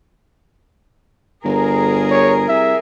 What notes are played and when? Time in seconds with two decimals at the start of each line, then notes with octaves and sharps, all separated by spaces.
1.45 G1 G#4 A#4
2.11 C#5
2.49 C2 E5